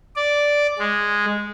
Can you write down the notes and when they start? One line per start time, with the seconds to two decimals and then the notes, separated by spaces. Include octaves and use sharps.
0.16 D5
0.79 G#3